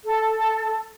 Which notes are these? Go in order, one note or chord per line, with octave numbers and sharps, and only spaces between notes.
A4